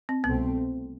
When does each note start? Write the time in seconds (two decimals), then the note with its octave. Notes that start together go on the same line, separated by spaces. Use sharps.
0.09 C4
0.24 C2 B2 A3 B3 C4